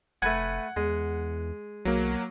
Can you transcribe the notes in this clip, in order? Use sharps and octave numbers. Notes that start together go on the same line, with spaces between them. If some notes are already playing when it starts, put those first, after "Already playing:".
F1 A3 B4 F#5 G#5 G#6
E2 G#3
B1 F#3 A#3